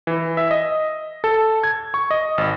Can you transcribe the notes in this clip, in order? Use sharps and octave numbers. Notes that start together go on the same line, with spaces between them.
E3
E5
D#5
A4
G#6
C#6
D#5
G#1